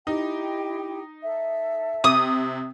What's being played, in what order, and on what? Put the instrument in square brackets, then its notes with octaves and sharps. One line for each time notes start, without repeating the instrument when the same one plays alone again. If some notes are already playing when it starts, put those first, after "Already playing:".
[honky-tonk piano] D#4 [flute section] E4 G4 G5
[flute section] A4 E5
[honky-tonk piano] C3 [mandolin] D#6